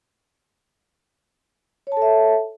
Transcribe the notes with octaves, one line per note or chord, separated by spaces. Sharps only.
A4 C#5 E5 A5